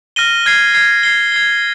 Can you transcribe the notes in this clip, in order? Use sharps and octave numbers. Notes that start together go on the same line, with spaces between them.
F6 A#6 D#7 G7
F6 G#6 C7
F6 G#6 C7
G#6 C7 G7
G#6 C7 G7